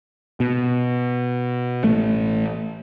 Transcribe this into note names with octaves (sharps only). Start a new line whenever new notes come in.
B2
A1 A3